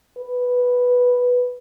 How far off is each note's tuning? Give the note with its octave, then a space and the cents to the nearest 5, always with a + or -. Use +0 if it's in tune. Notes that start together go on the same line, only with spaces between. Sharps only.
B4 -5